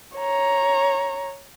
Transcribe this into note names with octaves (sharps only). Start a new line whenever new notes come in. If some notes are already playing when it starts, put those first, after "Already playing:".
C#5 A#5